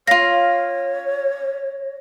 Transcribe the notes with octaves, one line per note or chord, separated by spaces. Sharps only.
F4 C#5 F5 A#6